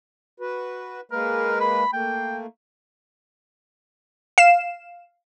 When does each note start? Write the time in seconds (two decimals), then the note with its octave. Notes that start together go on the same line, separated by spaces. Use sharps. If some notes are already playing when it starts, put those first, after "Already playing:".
0.40 F#4 B4
1.12 G#3 A#3 A#4 B4
1.61 B5
1.93 A3 A#3 G5
4.38 F5 C7 E7